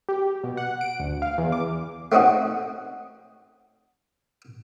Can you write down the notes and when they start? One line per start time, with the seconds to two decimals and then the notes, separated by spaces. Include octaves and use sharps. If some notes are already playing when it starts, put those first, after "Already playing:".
0.09 G4
0.43 B2
0.57 F#5
0.81 D7
1.00 D2
1.22 F5
1.38 E2
1.52 D6
2.12 A3 C4 C#4 D#4 F#4